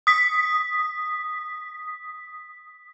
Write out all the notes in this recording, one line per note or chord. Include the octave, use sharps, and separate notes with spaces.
D#6 B6